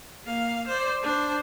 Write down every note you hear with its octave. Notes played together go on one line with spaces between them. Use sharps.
A#3 F5
C5 D5
D4 C5